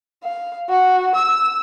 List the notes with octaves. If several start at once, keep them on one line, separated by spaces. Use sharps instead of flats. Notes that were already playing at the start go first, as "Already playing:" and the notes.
F5
F#4
E6